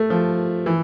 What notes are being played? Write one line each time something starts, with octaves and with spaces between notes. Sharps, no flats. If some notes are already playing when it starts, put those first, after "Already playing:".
Already playing: A3
F3
E3